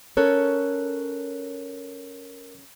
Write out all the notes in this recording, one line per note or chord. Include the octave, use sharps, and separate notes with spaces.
C#4 A4 A#4 C#5 F#6